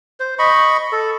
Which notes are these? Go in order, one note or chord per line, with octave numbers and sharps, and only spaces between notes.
C5
D#5 B5 C#6
A4